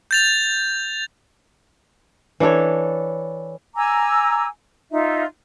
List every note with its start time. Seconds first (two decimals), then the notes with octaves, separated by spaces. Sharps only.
0.11 G6 A6 F7
2.40 E3 D4 A4 C#5
3.76 G#5 A#5 D6 E6
4.91 D#4 F4 E5